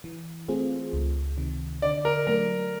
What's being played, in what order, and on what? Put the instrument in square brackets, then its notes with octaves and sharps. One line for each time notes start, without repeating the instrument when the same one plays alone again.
[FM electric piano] E3
A3 C4 F4 G#4
C#2
C3 D#3
[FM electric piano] D3 [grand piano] D5
[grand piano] A#4
[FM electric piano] F#3 A3 [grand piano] A#4